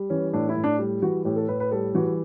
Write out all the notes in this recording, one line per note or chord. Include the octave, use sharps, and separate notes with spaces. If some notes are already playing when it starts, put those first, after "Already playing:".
Already playing: G3
E3 C#4
A2 D4
E4
A2
D4
G3
E3 F#4
A2 G4
A4
A2 B4
B4
G3 A4
E3 F#4